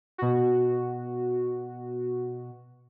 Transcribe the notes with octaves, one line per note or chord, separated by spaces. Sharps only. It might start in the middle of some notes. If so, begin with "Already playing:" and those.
B2 F#4